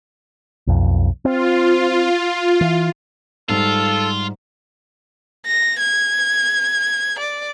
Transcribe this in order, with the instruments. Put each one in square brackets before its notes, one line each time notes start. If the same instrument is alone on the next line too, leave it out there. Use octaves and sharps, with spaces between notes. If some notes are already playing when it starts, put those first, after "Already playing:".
[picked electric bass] B1 F2
[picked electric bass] C4 [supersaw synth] F4
[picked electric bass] E3
[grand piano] G#2 G3 [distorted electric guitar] F4 [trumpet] A4
[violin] A#6
G#6
D5